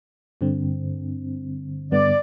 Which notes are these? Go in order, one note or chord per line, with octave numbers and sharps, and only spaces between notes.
G2 D3 C4
G2 D3 B3 D5